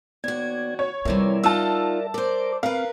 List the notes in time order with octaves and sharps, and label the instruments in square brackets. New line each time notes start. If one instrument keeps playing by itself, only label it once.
[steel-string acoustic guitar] D#2 F#4 [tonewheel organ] B3 D5 G#6
[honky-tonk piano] C#5
[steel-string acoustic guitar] F2 C3 E3 [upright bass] G3 E4 [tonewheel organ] A#4 D5 E5
[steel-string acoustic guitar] D#4 F4 F#5 [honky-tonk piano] A5 E6
[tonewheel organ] A#4 D6 [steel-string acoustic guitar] C5 D5
[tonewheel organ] C4 [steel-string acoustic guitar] A#4 B4 [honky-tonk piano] F5